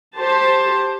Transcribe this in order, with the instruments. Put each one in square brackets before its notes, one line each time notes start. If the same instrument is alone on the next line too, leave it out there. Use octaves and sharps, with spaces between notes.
[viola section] G4 C5 A5